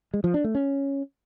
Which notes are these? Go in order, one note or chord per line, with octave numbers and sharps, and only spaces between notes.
G#3
F3
D4
A3
C#4